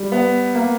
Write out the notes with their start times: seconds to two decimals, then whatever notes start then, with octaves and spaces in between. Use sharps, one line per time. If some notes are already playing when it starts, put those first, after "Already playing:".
Already playing: G3
0.12 B3
0.55 A#3